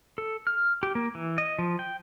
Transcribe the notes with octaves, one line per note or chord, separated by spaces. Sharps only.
A4
F6
G4
A#3
E3
D#5
F3
G5